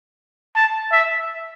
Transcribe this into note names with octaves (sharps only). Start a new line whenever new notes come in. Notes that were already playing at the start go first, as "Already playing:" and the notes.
A5
E5